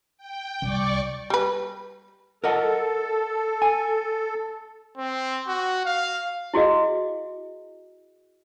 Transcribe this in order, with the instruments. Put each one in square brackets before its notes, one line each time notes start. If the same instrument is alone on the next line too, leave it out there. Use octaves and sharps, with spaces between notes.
[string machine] G5
[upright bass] C2 [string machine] D5 C#6 D6
[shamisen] G3 B4
[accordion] A4 [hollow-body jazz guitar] A#4 D#5 F#5
[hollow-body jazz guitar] G#5
[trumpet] C4
F#4
F5
[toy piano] E4 F#4 G#4 D#5 F5